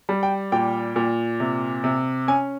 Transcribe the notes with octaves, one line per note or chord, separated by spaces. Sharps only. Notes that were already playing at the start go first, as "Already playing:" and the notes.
G3
G5
A#2 G5
A#2
C3
C3
C#4 G#5